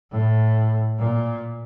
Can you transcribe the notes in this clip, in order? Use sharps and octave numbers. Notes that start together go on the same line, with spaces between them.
A2
A#2